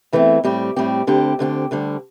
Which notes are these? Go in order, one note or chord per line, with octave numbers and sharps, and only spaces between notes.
E2 E3 A3 C4
A2 G3 C4 G4
A2 G3 C4 G4
D2 D3 C4 G4
D2 D3 C4 G4
D2 D3 G3